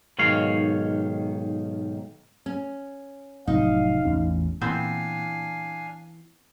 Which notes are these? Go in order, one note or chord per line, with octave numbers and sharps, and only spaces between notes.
B1 G#2 D#3 C#5 F5
C#4
F1 A2 F#3 D#4 F5
A1 E2 C#4
A#2 E3 B3 C4 D4 C5 F5 G#5